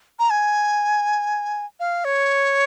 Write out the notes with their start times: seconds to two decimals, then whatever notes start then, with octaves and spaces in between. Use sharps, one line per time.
0.19 A#5
0.30 G#5
1.80 F5
2.05 C#5